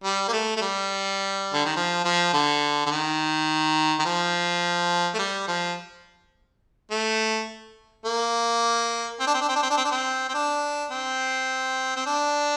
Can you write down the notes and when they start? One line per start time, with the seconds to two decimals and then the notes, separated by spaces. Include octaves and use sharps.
0.04 G3
0.29 A#3
0.33 A3
0.57 A3
0.62 G3
1.53 D3
1.65 D#3
1.76 F3
2.04 F3
2.33 D3
2.86 D3
2.91 D#3
3.99 D#3
4.05 F3
5.14 A3
5.19 G3
5.48 F3
6.91 A3
8.06 A#3
9.20 C4
9.27 D4
9.34 C4
9.41 D4
9.49 C4
9.56 D4
9.62 C4
9.70 D4
9.77 C4
9.85 D4
9.91 C4
10.29 C4
10.34 D4
10.91 C4
11.96 C4
12.06 D4